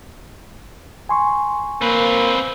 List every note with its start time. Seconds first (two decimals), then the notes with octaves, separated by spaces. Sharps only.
1.09 G#5 C6 C#6
1.81 A#3 C4 B4